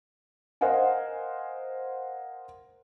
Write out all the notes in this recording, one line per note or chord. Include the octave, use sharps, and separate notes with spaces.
A#4 C5 D#5 F5 F#5 G#5